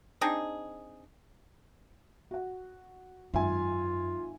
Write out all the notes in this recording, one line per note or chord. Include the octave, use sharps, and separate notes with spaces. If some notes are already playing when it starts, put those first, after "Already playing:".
C4 D4 D#4 G#4
F#4 F#5
G#1 F#2 F4 E5 G#5